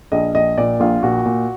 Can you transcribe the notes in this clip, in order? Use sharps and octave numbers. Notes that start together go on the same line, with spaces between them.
A#1 D#5
A#1 D#5
A#2 D5
A#1 F4
A#2 F#4
A#2